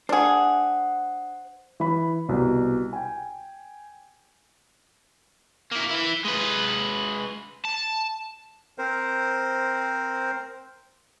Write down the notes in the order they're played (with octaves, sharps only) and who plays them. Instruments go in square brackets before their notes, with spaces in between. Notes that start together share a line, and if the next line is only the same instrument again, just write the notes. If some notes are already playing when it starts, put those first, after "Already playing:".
[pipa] D4 G#4 [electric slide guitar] C5 F#5
[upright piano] E3 B5
C2 B2
G5 G#5
[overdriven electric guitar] A#3 E4
E3 E4
G#3 B4
A5
[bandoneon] C4 A#4 C5